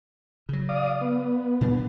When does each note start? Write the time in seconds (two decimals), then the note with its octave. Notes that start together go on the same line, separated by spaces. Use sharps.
0.49 C#3 F#3
0.69 D5 F5 D#6
1.01 B3
1.61 A#2 G3 D4